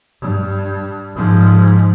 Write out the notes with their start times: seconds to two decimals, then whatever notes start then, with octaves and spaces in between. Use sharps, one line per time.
0.21 G2
1.16 G#2 F3